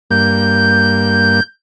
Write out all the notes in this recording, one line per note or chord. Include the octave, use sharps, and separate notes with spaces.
G2 A#3 G6